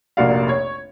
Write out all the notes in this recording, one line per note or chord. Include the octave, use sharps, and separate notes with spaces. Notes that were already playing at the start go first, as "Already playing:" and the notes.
F1 A#1 A#3 F#4 D5 F5
C#5